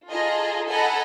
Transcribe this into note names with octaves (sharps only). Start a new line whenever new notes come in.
F4 G#4 A4 D#5 A#5
A4 D#5 F#5 G#5 A#5 B5